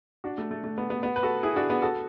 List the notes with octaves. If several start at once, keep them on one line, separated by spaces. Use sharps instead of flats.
D4 F#4
A3
A3
A3
B3
B3
B3
B4
F#4 A4
E4 G#4
D4 F#4
B3
F#4 A4